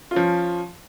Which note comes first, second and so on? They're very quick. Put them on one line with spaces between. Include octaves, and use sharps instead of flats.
F4 C#4 F3